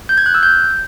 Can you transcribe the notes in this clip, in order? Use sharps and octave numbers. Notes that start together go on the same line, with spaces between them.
G6
G#6
F#6
E6
G6